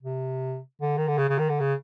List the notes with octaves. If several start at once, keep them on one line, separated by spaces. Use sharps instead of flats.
C3
D3
D#3
D3
C#3
C#3
D#3
D3
C#3